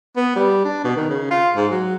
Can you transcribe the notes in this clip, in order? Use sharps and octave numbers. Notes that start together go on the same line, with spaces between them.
B3
G3
D4
B2
D#3
C#3
F4
G#2
F#3